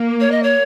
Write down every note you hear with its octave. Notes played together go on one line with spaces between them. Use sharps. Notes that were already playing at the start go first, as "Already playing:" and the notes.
Already playing: A#3
C#5
D#5
C#5